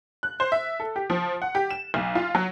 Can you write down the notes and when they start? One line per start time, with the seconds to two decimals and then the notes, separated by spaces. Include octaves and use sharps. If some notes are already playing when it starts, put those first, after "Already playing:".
0.23 F#6
0.40 C5
0.52 E5
0.80 A4
0.96 G4
1.10 F3
1.42 F#5
1.55 G4
1.71 E7
1.94 B1
2.15 F4
2.35 F#3